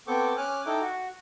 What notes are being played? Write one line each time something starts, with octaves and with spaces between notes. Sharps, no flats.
B3 C4 A4 G5 C#6 D6
C#4 G#5 D6 F6 F#6
D#4 E4 A4 G5 D6
F#4